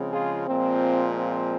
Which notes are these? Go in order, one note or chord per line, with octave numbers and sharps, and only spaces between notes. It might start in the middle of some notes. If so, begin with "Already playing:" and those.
Already playing: C#3 F3 G#3 C4
F4 G#4
A#2 F3 G#3 C4
C4